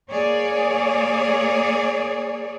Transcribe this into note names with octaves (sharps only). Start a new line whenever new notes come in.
A#3 G#4 C#5 D5